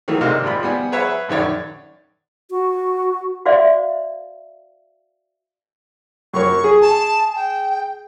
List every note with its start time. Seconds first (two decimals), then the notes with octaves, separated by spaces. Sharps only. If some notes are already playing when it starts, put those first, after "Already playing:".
0.08 D#3 E3 F#3 A3 A#3
0.21 C3 A#3 D4 D#5 F5
0.43 G#1 G3 F4 B5
0.63 G3 B3 G#5
0.92 G#4 B4 C#5 E5 F#5
1.29 A#1 F#2 D#3 C#5 D5
2.51 F#4
3.45 F#4 C5 D5 E5 F5
6.34 F#2 A#4 C#5 C#6
6.64 G#4
6.81 A5
7.35 G5